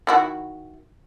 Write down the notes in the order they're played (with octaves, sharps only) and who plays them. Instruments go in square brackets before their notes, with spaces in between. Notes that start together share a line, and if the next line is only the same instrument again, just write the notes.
[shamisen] D#3 E4 F#4